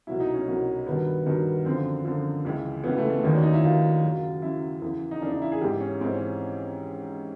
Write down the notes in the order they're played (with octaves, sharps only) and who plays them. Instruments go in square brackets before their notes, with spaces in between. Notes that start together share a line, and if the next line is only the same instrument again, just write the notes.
[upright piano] C2 B2 F#3 E4
D#4
C#4
C2 B2 F#3
G2 D#3 F#3 B3
G2 D#3 F#3
F#2 D3 F3 C4
F#2 D3 F3
C#2 C#3 E3
C#2 C#3 E3 B3
A3
A3
D#2 D#3 F#3 C#4
D4
D#4
E4
D#2 D#3 F#3 F4
F#2 C#3 F#3
F#2 C#3 F#3 E4
E2 C#3 E3
D#4
E2 C#3 E3 D4
D#4
E4
G#4
G#2 E3 G4
C#4
G#2 E3 C4
C#4